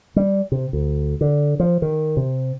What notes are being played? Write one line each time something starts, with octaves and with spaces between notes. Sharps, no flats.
G3
C3
D2
D3
F3
D#3
C3